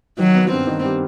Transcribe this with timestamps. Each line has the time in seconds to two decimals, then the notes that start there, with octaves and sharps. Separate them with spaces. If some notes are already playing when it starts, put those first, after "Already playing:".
0.19 D#3 F#3
0.35 B3
0.51 G2 C4
0.67 D#3
0.84 G3